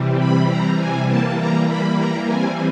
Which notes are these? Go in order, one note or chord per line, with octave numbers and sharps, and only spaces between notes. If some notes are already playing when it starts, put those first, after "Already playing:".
Already playing: C3 E3 G3 C4
B5
A#5
G#5
E3 G3 A#3 A5
A#5
B5
A#5
E3 G3 C4 G#5